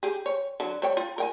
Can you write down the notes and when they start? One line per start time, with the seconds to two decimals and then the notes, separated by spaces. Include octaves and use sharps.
0.03 G4 G#4
0.26 C#5
0.60 D3 F#3
0.82 G3 C#5 G5
0.97 F4
1.18 A#4 G5 G#5